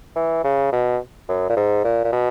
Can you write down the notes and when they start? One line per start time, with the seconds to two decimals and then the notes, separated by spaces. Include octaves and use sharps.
0.16 E3
0.44 C#3
0.72 B2
1.29 F#2
1.50 A#2
1.57 G#2
1.85 A#2
2.04 A#2
2.13 B2